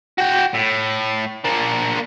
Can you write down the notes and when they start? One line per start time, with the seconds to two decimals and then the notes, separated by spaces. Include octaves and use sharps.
0.18 F#4 G5
0.54 A2
1.45 A#3 D4